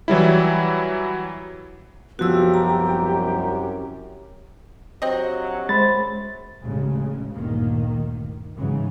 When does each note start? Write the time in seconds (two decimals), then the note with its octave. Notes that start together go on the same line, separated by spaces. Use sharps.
0.08 E3 F#3 G3 E4
2.19 C2 F#2 F3 B3 F#4 G4 E6
2.54 A#5
5.02 A#1 C3 F#3 C4 D#5
5.69 F#2 G#3 C5 B5 A6
6.61 A1 D2 C#3 G#3
7.31 G1 D2 A#2 D#3 A#3
8.57 G#2 C#3 E3 F#3